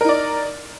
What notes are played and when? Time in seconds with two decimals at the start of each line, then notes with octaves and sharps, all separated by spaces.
0.01 A#4
0.05 D#4
0.09 D5